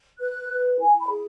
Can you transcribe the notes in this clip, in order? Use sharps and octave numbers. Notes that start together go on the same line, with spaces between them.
B4 F#6
B4
E4 G#5
B5
G#4